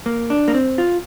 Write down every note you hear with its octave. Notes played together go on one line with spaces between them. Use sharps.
A#3
D4
A#3
C4
F4